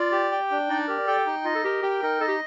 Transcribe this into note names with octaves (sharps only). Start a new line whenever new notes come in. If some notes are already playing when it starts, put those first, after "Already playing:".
Already playing: F4 D5
G4
G5
D4
D#4 D5
G4 A#4
A4 G5
D#4
F4 D#5
A4
G4 A#4
G4 G5
D#4 A#4
A4 D#5
G4